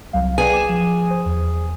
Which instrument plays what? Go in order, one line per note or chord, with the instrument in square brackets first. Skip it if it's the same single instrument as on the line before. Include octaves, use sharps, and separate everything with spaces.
[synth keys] C2 F#3 F5
[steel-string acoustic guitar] G#4 G#5 [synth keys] B4 D5 G5
[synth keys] D6 E7
F3
C5
E2